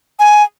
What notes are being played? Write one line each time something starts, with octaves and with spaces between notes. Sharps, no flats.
G#5